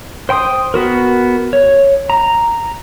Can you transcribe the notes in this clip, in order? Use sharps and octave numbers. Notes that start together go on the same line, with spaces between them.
C5 G5 C6 D#6
B3 F#4 A#4
C#5
A#5